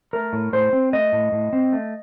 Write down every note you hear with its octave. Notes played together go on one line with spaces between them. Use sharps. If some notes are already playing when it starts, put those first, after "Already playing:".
A3 A#4
A2
A2 C5
C4
A3 D#5
A2
A2
C4
A3